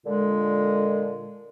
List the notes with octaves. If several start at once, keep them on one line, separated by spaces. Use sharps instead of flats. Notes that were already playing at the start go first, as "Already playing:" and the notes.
A#2 D3 G#3